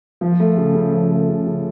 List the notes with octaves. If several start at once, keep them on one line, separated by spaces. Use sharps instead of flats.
F3
A3
C#3
C#3
F3
A3
C#3
C#3